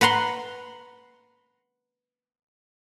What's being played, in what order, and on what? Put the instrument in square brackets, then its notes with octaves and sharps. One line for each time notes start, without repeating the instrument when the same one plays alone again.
[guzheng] B4 F#5 A#5 C6